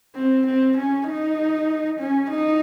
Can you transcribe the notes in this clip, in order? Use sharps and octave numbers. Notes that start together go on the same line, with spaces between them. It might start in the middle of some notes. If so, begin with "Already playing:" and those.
C4
C4
C#4
D#4
C#4
D#4